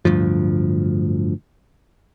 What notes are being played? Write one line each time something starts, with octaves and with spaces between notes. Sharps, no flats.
D1 D2 G2 F3